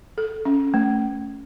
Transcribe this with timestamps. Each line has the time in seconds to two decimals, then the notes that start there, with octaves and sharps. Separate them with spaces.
0.18 A4
0.45 C#4
0.74 A3